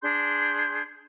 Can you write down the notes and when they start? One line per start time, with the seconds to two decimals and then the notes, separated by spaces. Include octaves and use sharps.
0.02 D4 G#4 C6 G6